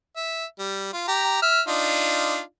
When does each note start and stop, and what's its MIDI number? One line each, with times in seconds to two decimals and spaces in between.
0.17 0.45 76
0.59 0.90 55
0.93 1.03 65
1.08 1.42 67
1.08 1.42 82
1.42 1.61 76
1.42 1.61 89
1.68 2.41 62
1.68 2.41 63
1.68 2.41 65